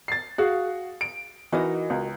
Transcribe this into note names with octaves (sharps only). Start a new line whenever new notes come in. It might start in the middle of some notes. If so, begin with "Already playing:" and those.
A6 C7
F#4 G#4 F5
D7
E3 D#4 F#4 A#4 D#5
C#2